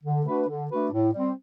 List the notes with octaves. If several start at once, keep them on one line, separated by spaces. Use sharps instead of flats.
D3
A3 D4 F#4 B4
D3
A3 D4 F#4 B4
A2
G3 C4